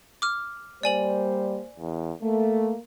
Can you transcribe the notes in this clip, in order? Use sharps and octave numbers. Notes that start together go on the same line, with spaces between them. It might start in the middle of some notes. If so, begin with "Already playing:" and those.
D6 F6
G3 A#3 C5 D5 G#5 F#7
E2
A3 A#3